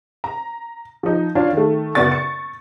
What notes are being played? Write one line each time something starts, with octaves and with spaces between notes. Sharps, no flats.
A#5
F3 D#4
C#4 D4 F4 F5
D#3 A3
F#1 B3 F#4 D5 C#6 A6
C#6 C#7